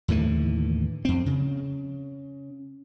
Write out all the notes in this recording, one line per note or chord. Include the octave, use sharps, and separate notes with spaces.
D#2 A2 D3 E3
F2 C4
C#3